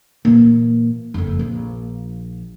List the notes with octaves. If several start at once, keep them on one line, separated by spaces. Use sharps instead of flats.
A#2 E3
F#1 F2
A#1 F3